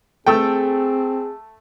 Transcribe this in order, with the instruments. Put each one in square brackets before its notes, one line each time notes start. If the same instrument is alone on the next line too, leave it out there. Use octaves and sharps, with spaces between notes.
[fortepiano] A3 A4 G5 [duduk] C4 [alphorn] G#4 [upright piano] A5 E6